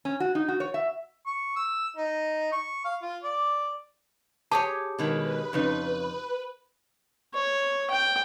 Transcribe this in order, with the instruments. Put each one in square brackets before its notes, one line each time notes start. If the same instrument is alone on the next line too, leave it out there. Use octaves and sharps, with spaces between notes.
[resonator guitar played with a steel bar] C#4
F#4
D#4
F#4
C#5
E5
[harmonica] C#6
E6
D#4
C#6
F5
F4
D5
[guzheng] G4 G#4 C#5 [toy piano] A5
[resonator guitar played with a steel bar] B2 D#3 G#3 [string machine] B4
[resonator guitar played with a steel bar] F2 C#3 D#4
[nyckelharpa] C#5
G5